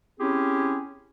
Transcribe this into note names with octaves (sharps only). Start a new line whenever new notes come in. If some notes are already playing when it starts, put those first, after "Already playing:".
C4 C#4 E4 G4 G#4